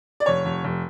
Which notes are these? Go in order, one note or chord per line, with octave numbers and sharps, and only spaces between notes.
D5
F1 C#5
F1
F1